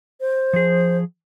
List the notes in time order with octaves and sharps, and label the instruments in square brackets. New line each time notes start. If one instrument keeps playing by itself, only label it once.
[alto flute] C5
[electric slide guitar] F3 G#4